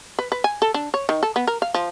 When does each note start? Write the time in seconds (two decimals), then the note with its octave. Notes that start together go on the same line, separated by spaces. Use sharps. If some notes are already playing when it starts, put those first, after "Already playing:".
0.19 B4
0.32 B4
0.44 G#5
0.62 A4
0.74 D4
0.94 C#5
1.09 D#3
1.23 A4
1.36 B3
1.47 A#4
1.62 F5
1.74 F3